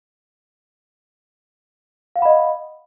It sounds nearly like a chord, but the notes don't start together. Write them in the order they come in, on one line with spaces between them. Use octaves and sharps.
F5 F#5 B5 D#5